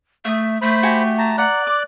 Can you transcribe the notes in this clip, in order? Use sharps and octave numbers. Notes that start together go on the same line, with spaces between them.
A3 E5 D#6
A3 C5 B5
F#4 G4 G#5
A5 A#5
D5 F#5 A#5 F#6
D6